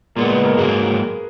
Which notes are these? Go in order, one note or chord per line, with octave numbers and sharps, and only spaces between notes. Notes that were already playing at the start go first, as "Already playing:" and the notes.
A#2 G#3 B3 A#4
B4
A#4
G#2 F#3 A#3 G#4